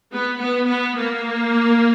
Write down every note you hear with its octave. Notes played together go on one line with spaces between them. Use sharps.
B3
B3
B3
A#3